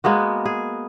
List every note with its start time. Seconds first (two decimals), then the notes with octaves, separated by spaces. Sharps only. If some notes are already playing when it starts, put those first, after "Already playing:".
0.04 G#3 A#3 B3 F#4
0.45 G#4